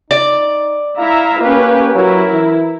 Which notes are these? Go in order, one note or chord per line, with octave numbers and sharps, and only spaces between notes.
D#4 D5
E4 E5 F5 A#5
A#3 C#4 G4 B4
F#3 E4 A#4
E3